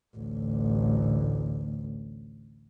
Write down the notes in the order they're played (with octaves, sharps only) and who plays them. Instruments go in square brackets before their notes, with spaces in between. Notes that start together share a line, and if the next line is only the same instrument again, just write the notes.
[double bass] A1 D2